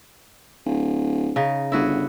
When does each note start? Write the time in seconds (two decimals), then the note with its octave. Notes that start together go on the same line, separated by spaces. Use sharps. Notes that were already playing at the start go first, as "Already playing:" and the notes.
0.66 D1
1.36 C#3 D#4
1.72 G1 E4 F#4 G#4